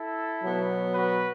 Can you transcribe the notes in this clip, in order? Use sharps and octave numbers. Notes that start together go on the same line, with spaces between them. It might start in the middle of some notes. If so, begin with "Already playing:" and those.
Already playing: E4 A4
B2 F#3 B3
F#4 B4